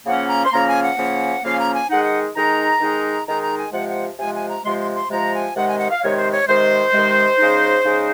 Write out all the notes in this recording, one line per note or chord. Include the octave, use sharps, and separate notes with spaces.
C#3 F3 A#3 C#4 F#5
A#5
C6
C#3 F3 A#3 C#4 A#5
G#5
F#5
C#3 F3 A#3 C#4
C#3 F3 A#3 C#4 F5
G#5
A#5
G#5
D#3 G#3 D#4 F#5
F#5
D#3 G#3 D#4 A#5
D#3 G#3 D#4
D#3 G#3 D#4 A#5
A#5
G#5
C3 F3 G#3 F#5
F#5
C3 F3 G#3 G#5
G#5
A#5
C3 F3 G#3 C6
C6
C6
C3 F3 G#3 A#5
G#5
C3 D#3 G#3 F#5
G#5
F#5
F5
C3 D#3 G#3 C#5
C5
C#5
C3 D#3 G#3 C5
C3 D#3 G#3
C#3 G#3 D#4
C#3 G#3 D#4